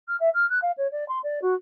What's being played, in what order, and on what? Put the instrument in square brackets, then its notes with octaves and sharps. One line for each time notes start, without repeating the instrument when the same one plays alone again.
[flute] F6
E5
F6
F#6
F5
C#5
D5
C6
D5
F#4